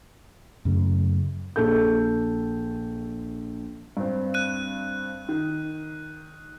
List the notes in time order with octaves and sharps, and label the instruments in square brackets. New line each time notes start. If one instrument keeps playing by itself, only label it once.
[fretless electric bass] F#2 C#3 A3
[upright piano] A#1 A4 G6
G2 C4
[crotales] F#6 D#7
[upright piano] D#3